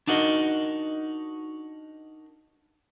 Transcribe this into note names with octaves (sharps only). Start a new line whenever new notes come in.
D4 D#4 F#4 A#4 D#5